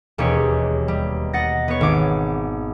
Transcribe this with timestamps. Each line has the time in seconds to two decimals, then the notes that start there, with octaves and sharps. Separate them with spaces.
0.18 E1 D#2 G4 G#4 C#5
0.88 G3
1.33 D#5 F#5 A6 A#6
1.68 B3 C#5
1.81 G#1 D6